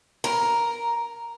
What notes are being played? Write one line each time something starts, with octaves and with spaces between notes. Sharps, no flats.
A#4